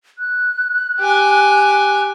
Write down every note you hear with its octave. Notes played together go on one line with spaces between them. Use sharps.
F#6
G4 G#5